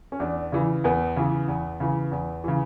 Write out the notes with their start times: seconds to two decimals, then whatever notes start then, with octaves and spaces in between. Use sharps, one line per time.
0.12 C#4
0.20 E2 D4
0.52 C#3 E3
0.84 E2 B3
1.16 C#3 E3
1.48 E2
1.80 C#3 E3
2.12 E2
2.44 C#3 E3